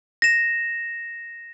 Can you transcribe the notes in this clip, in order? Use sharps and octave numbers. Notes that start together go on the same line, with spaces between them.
A#6 E7